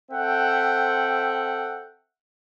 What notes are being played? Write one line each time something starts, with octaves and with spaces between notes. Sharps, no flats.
C4 A4 E5 F#5 G5